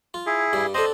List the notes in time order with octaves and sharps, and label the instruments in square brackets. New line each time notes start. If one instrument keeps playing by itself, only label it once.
[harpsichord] F4
[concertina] E4 G#4
[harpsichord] G2 G3
[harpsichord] C4 D4 A4 [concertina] C5 D#5